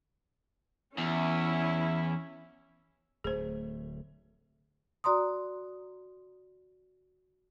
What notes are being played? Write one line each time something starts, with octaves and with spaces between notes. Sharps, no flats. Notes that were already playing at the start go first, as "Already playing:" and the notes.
E2 C#4 E4
D1 A3 G#4 C5
F#4 D5 A#5 C6 D#6